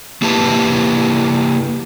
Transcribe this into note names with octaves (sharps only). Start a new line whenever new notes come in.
A#3 E4 G4 B4 A5